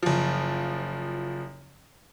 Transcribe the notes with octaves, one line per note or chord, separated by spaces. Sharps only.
F#1 F3